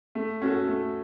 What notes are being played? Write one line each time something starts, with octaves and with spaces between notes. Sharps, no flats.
A3
C#4 F#4 A4
A3